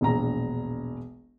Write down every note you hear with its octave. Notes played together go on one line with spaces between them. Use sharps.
E1 A#1 A#5